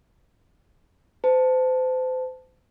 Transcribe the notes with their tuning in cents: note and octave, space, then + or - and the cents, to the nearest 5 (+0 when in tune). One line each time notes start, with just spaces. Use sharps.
C5 -35 A5 +0